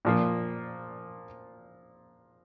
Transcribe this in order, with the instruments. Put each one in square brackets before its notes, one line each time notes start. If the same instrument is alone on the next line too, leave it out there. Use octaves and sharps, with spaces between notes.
[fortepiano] A#2 F3 A#3